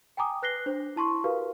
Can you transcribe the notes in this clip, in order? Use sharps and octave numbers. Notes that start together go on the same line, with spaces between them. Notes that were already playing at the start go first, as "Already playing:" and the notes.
G5 G#5 A#5 D6 D#6
B4 F#6 A#6 C7 G7
D4 C5
E4 A5 C6 C#6
F#4 G4 A#4 B4 F5